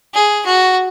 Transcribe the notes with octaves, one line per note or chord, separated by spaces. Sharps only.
G#4
F#4